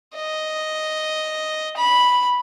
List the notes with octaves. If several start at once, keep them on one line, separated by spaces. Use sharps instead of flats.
D#5
B5